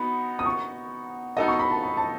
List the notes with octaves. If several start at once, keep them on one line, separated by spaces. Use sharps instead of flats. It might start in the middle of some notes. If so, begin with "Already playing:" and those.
Already playing: B3 D#4 F#4 B5
D#6
C#6
B3 D#4 F#4 A4 D#5 D#6
C#6
B5
A5
B5
A5